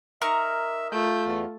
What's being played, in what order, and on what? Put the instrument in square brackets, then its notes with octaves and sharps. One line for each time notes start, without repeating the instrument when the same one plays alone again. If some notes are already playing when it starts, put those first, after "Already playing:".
[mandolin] D#4 A#4 C#6 [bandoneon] E5
[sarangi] A3 [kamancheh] F4 [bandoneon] G6
[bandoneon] E2